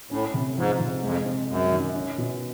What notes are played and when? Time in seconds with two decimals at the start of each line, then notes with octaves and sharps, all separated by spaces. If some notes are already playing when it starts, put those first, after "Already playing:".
0.11 A2 C#4
0.34 C3
0.57 G#2 F3
0.80 C3
1.03 F2 G#3
1.26 C4
1.48 F#2 G#3
1.72 D#3
1.95 C#4
2.18 B2